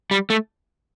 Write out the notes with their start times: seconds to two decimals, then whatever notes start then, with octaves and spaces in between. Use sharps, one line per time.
0.11 G3
0.30 A3